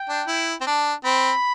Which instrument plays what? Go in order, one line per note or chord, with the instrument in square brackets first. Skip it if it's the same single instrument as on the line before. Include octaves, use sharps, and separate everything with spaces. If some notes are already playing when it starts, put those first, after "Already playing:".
Already playing: [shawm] G5
[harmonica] D4
E4
C4
D4
[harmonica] C4 [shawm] B5